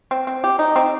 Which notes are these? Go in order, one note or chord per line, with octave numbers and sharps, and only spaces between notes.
C4
C4
G4
D#4
C4